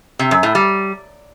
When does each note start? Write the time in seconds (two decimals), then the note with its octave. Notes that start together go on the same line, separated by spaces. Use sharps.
0.19 C3
0.31 F#2
0.43 A2
0.55 G3